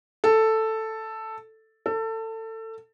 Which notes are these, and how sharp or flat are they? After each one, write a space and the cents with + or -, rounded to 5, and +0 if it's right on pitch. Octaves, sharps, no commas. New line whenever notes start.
A4 +5
A4 +25